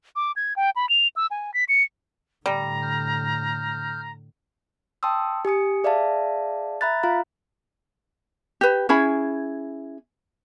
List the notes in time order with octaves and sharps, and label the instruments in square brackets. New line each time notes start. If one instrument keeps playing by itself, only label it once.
[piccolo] D6
G#6
G5
B5
F7
E6
G#5
B6
C#7
[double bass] A2 D3 [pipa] G3 [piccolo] A#5
[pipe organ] F6 G6
[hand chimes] G5 A5 C6 D#6 E6
G4 G#5 D#6 C#7
G#4 D5 E5 F5 A5
E5 A#5 B5 F#6 A6
F4 F5 A#5
[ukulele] G4 B4
C#4 E4 G#4 B5